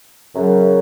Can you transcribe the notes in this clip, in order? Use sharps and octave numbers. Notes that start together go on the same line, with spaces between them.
F#2 C#3 F#3